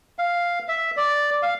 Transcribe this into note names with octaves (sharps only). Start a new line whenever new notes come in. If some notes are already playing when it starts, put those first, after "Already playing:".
F5
E5
D5
F5